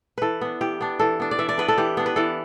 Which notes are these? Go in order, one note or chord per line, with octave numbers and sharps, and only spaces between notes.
E3 A4 B4
B3 D4
E3 G4
B3 D4
E3 A4
B3 D4
D5
E3 E5
D5
B3 D4 B4
A4
E3 G4
B3 D4
B4
E3 A4